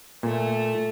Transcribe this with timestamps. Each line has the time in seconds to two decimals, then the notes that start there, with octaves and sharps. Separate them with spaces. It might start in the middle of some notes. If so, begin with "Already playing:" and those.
0.23 A#2 A3